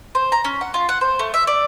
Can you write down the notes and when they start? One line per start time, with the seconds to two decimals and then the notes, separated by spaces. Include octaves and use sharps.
0.15 C5
0.32 A#5
0.44 C#4
0.61 F#5
0.74 F4
0.89 F#5
1.01 C5
1.19 A3
1.34 E5
1.47 D5